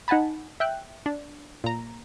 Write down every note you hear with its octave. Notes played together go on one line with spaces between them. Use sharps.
D#4 F#5 G#5 A5 B5
E5 G5 F#6
D4
A#2 A#5